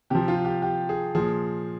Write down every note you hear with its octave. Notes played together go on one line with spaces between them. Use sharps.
C3 F3 G4
F4
G4
G4
G#4
A#2 F3 G#4